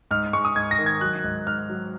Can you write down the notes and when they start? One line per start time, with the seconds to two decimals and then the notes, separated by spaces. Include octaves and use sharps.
0.11 G#2 F6
0.33 G#3 C#6
0.45 D#6
0.56 G#2 G#6
0.71 A#6
0.78 D#3
0.86 G#6
1.01 F#3 F#6
1.24 G#2
1.46 G#2 F6
1.69 F#3